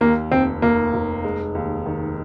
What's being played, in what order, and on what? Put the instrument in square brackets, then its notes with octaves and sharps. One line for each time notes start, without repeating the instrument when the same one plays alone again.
[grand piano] D#2 [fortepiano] A#3
[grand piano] F1 [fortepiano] C4
[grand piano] F1 [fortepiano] A#3
[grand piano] F1
G#3
D#2
D#3